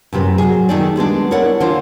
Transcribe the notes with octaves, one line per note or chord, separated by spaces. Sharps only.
F#2 A2 C3 B4
F#3 G#4
D#3 A3 D#4 G#4 D5
G3 G#3 B3 D4
E4 A#4 C#5 D5 F#5
D3 E3 D4 F4 C5